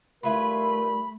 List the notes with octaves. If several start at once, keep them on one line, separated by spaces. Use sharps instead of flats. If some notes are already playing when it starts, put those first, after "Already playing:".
D#3 G3 A3 E4 F4 A#4 B4 B5